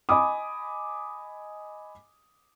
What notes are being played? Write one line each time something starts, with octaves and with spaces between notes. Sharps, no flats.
D#5 G#5 B5 D6 D#6